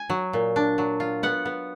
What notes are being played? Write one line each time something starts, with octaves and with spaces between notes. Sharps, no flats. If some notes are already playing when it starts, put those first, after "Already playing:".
Already playing: G#5
F#3
A#2
D4
F#3
F4
B3 F#5
B3